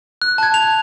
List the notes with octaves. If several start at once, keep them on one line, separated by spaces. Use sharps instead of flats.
F#6
A5 G#6
F7